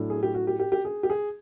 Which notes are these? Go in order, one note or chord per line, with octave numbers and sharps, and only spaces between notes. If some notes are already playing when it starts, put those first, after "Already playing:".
Already playing: A2 F#3 A3 D4
G#4
G4
F#4
G4
G4
G4
G#4
G4
G#4